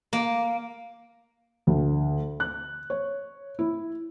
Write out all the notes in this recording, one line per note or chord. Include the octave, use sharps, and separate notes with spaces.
A#3
D2
F#6
C#5
E4